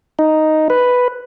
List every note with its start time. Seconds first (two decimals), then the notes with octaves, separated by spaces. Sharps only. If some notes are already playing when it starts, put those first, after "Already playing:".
0.19 D#4
0.70 B4